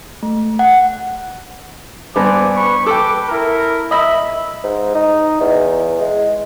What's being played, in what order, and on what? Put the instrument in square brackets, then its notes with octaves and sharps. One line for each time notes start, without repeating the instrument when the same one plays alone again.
[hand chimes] A3
F#5
[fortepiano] G2 B3 [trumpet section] C5 G#5 D6
[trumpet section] B4 B5 C#6
[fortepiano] A4 G5 [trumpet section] B4 D6
[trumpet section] E4 A#4
[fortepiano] D#5 B5 [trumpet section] E5
[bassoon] G#2
D#4
E2
G#3